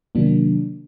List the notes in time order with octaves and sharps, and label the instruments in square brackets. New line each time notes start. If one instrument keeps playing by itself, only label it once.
[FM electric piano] C3 D#3 F#3 A#3 D4